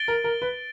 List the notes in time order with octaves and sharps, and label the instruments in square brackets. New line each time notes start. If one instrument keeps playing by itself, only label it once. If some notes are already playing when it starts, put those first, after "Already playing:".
Already playing: [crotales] A6 D7 G7
[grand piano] A#4
A#4
B4